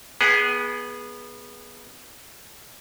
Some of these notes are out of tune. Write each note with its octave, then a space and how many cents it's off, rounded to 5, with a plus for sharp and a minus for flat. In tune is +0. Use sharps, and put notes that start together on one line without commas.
B3 -15 G#4 +0 F#5 +45